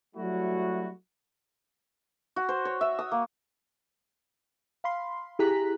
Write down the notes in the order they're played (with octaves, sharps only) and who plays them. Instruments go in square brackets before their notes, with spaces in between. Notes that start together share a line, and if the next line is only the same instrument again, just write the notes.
[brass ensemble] F#3 G3 A3 E4 F#4
[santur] F#4
C5
C#5
E5
D#6
A#3
[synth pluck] F5 B5 C6
E4 G4 G#4 A#5 F#6 B6